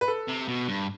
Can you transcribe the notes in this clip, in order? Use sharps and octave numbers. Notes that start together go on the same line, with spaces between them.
B4
A4
C3
B2
G2